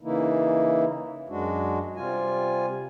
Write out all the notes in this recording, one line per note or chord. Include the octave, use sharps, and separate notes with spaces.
C#3 E3 A#3 D#4 E4
F#2 G#3 D4 F#4
C3 G3 F4 G#5